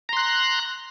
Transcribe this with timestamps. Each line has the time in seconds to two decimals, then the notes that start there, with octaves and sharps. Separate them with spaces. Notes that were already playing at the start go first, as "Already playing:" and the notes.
0.09 A#5
0.13 C6
0.17 F#6